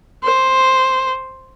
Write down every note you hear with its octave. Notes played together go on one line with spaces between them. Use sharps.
C5